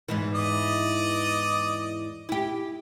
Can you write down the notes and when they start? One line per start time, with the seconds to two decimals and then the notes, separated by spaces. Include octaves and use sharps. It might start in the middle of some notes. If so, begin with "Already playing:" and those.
0.08 E2 G#2 E3
0.34 D5 D#5
2.29 E4 G4